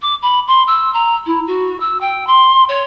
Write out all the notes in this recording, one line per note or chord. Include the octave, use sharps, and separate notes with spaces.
D6
B5
C6
E6
A#5
E4
F#4
E6
G5
C6
C#5